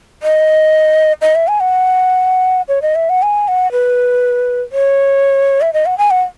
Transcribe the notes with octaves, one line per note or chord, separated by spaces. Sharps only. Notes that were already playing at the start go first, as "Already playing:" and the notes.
D#5
D#5
E5
G#5
F#5
C#5
D#5
E5
F#5
G#5
F#5
B4
C#5
E5
D#5
F#5
G#5
F#5